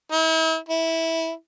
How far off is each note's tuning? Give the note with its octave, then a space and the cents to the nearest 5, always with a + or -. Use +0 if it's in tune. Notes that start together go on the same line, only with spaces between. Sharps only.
E4 -40
E4 -15